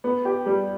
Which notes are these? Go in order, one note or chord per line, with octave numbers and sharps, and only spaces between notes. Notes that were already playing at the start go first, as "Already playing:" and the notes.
B3
G4
G3